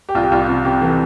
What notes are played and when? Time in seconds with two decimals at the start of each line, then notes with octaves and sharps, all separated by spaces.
0.09 G4
0.15 C2 F4
0.23 G4
0.32 C2 F4
0.40 G4
0.48 C3 F4
0.65 C3 G4
0.81 E3 A4